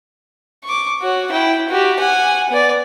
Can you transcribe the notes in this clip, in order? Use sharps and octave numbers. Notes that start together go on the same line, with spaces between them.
C#6 D6
F#4 C#5
E4 G5
F#4 G4
F#5 G#5
B3 D5